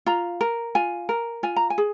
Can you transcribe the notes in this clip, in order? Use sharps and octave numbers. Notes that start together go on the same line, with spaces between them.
F4 A#5
A#4
F4 G#5
A#4
F4 G#5
A#5
G#5
G#4